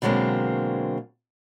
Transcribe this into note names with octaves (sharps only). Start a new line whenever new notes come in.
B2 D3 F#3 G#3 A#3 C4